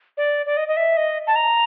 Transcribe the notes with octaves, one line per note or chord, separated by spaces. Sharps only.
D5
D5
D#5
D#5
E5
D#5
A5
A#5